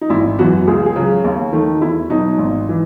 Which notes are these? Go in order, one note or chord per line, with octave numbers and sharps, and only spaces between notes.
D#4
G#1 E4
F#2 E3 B3 F#4
C#2 G#4
G#4
C#3 F#3
D#2
D#3 A3
E2 E4
B2 F#3 D#4
G#1
E3